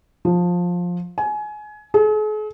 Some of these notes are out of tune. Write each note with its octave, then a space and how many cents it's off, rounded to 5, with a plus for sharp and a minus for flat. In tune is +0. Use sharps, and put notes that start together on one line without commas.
F3 +15
G#5 +25
G#4 +45